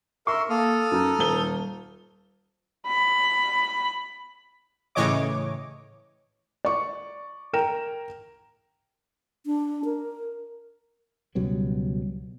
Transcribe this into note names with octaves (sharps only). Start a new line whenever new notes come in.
A#4 E5 C6 C#6
A#3 A4 D#6 F6
F#2 D#4
D#1 G7
B5
A2 C#3 E3 C#5 D#5 D6
D5 C#6
A#4 G5 E7
D4
A#4
C#2 B2 F#3 G3